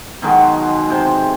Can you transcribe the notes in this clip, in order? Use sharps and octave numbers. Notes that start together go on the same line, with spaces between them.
B2 D#3 F#3 G#3
C3 C5